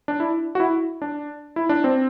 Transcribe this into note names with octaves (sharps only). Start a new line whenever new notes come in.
D4
E4
F#4
E4
D4
E4
D4
C4